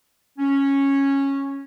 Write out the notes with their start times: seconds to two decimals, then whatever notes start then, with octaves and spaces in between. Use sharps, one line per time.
0.39 C#4